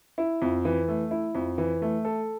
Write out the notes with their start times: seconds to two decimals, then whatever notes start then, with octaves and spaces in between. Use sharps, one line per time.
0.18 E4
0.42 F2
0.65 E3
0.88 A3
1.11 E4
1.35 F2
1.58 E3
1.82 A3
2.05 A4